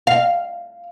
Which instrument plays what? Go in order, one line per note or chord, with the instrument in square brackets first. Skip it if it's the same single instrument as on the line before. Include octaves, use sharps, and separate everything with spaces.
[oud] F5